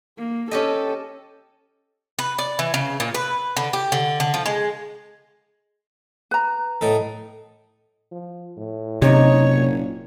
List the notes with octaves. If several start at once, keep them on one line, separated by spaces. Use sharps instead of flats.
A#3
C#4 G4 A4 D#5
B4
D5
E3
C#3
A#2
B4
D3
G4
D3
D3
F3
G#3
B4 A#5
A2 D#4 A4
F3
A2
F#1 C3 D#4 C#5
A#2